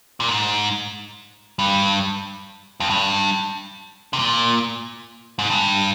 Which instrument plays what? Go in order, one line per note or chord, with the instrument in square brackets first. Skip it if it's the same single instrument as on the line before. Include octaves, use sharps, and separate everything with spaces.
[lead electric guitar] A#2
G#2
G2
F2
G2
C3
A#2
G#2
G2